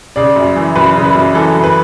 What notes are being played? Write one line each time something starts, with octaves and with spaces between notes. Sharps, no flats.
C#3 D5
F#2
E3
F#2 B4
C#3
B4
F#2
E3 A4
F#2
B4